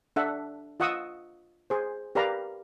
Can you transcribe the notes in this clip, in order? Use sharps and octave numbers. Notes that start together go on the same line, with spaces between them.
D4 A4 E5 F#5
F4 D#5 F#5 C#6 D#6 E6
G#4 C5
G4 A#4 B4 D5 F5 A#5